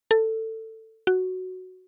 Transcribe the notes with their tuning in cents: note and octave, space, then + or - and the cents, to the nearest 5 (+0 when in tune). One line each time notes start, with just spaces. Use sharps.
A4 +15
F#4 +0